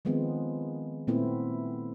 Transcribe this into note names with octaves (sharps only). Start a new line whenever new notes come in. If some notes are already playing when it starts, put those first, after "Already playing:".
D#3 F3 G#3 B3 C4
A#2 A3 B3 C4 E4